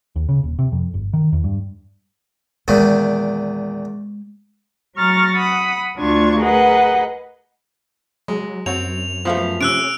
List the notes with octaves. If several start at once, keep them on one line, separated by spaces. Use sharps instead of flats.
D#2
C#3
D#1
C3
F2
G1
D#3
E2
G2
E2 A#2 D#3 G#3
F#3 A#5 C#6 F6 A6 A#6
F#5 B5 D#6
D2 D4 F4 C#6 G#6
G#4 A#4 B4 D#5 F#5
F#3 G#3
F#2 C4 F#4 C#5 F7
F3 A3 B3 C5 F5
C3 C#4 E6 F#6 D7